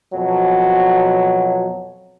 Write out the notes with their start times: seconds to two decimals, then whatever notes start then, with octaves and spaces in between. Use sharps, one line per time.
0.13 F2 B2 F#3